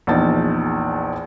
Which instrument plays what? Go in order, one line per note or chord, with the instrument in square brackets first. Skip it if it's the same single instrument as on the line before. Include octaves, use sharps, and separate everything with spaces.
[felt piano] A#1 E2 D#4 A5 A6